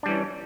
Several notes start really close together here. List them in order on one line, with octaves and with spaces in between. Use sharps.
D4 G3 E3 C#4